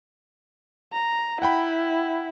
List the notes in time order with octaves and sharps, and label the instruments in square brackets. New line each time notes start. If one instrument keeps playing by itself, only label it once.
[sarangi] A#5
[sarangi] E4 [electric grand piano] F#5 G5 B5